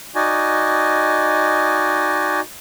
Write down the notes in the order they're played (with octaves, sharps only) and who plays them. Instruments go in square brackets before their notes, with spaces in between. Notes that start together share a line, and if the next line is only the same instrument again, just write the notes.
[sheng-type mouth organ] D#4 F#4 D5 D#5 G#5